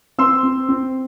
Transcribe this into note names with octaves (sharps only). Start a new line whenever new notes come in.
C4 C6 E6
C4
C4